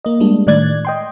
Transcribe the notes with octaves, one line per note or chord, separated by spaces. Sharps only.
A#3 D#5
G3 G#3 D4
A2 D#3 D5 F#6 G#6 A6
D#5 G5 C6